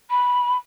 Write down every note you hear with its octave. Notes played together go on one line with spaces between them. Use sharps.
B5